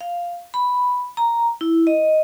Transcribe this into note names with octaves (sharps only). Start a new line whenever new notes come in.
F5
B5
A#5
E4
D#5